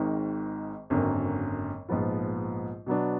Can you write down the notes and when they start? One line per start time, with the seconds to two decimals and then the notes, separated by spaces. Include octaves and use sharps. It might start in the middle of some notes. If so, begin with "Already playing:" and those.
Already playing: G#1 G#2 D#3
0.90 G#1 F#2 D3 F#3 A#3
1.89 A#1 G#2 F3 B3 F4
2.86 B2 F#3 B3 D4